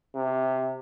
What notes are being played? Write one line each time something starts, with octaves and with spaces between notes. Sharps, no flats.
C3